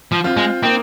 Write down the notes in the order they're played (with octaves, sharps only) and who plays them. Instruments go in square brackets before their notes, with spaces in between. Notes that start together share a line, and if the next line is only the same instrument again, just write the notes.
[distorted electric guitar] F3
[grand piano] C4 F4
[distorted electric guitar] G#3
[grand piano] A#3 D#4 [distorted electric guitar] C4